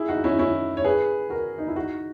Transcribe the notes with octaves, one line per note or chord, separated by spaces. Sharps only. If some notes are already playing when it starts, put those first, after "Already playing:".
Already playing: E4 G#4
D#4 F#4
C#4 E4
C#4 E4
C#5
G#4 B4
F#4 A#4
D#4
E4
D#4 F#4